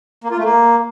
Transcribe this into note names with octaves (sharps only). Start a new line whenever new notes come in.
A#3
F4
A3
A#3